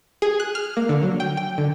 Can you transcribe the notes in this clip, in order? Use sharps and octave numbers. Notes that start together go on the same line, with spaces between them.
G#4
F#6
F6
A#3
D3
F#3
G5
G5
D3